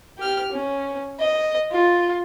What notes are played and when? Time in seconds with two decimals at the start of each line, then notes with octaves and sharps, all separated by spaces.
0.18 G4 F6
0.52 C#4
1.20 D#5
1.71 F4